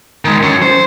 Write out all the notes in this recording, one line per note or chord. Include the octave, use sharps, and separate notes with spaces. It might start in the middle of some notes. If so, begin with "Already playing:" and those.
D#3 G#3
F#3 C#4
C5